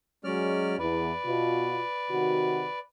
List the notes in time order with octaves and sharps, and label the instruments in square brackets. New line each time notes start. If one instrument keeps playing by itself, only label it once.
[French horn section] F#3 G#3 [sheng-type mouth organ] C#4 D5 F6
[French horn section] E2 [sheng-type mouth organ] B4 D5
[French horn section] B2 F4
C3 D#3 F#4